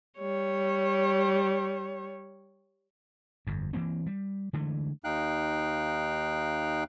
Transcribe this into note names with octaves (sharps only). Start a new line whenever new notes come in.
G3 C#5
G1 F2
E3 F#3 A#3 C4
G3
D3 E3 G#3 A3
D#2 D#4 F5 G5 F#6